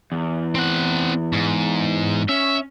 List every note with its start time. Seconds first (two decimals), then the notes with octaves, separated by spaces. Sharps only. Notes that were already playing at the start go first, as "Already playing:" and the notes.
0.12 E2
0.55 C4 F#5
1.33 G#2
2.29 C#4 E5